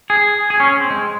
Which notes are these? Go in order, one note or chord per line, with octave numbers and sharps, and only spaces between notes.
G#4
G#4
C#4
C4
G#3